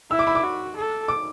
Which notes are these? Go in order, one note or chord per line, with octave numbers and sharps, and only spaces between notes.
E4 E6
D6
B5
D6
F#4
A4
D6